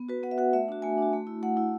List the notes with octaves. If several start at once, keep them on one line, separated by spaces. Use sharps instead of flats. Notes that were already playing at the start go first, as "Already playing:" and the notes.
Already playing: B3
F#4 B4
B3 F#5
E5
F#4 F#5
A3 E5
D4 F#4
A3 G#5
D4 F#4
A3
E4
A3 F#5
E4